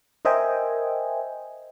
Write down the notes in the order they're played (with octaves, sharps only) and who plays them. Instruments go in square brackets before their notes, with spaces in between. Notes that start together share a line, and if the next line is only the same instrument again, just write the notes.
[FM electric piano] A#4 C5 D#5 E5 G5 G#5